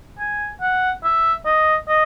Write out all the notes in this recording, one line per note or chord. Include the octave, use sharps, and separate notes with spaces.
G#5
F#5
E5
D#5
D#5